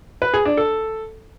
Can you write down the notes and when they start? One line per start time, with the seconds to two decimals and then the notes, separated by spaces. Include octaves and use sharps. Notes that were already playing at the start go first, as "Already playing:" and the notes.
0.22 B4
0.34 G#4
0.45 D4
0.57 A4